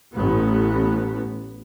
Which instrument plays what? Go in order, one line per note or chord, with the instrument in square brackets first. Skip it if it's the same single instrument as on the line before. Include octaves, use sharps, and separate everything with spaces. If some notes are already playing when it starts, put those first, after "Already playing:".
[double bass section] A1 B3